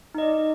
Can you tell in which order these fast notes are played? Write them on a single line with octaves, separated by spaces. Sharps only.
D#4 D#5 D5